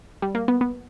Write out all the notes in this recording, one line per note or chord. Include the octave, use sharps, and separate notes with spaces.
G3
A#3
B3
B3